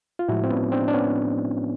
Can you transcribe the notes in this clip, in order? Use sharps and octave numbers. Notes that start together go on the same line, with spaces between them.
F4
A2 F3 G#3 E4 F#4
C4
B3 C#4
C4 D4
D4
B3 C#4